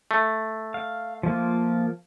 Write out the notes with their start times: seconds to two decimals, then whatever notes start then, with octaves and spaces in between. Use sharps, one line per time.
0.11 A3
0.74 F5
1.23 F3 A#3 F4